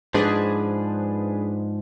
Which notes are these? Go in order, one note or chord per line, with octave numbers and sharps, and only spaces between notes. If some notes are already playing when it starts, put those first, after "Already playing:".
G#2 F3 D4 G#4 B4